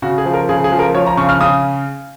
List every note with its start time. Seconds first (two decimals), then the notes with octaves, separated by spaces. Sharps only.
0.02 C#3 F#4
0.18 G#4
0.26 F3
0.34 A#4
0.49 C#3 G#4
0.64 G#4
0.72 F3
0.79 A#4
0.95 F3 C#5
1.07 A#5
1.17 C#3 C#6
1.29 F6
1.40 C#3 D#6